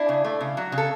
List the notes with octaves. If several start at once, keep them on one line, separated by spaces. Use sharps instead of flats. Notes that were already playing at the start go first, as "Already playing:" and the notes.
Already playing: D4 E4
C#3
A3
C#3
F#3
C#3
A4